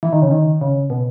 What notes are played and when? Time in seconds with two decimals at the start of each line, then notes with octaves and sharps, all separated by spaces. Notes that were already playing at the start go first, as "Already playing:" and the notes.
0.03 E3
0.13 D#3
0.22 C#3
0.31 D#3
0.61 C#3
0.90 B2